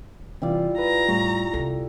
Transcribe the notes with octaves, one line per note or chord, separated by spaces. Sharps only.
C3 E3 G3 E4 F4 D5
B4 A#5
A2 G3 C#6
C2 E4 A4